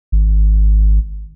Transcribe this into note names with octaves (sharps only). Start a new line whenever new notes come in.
G#1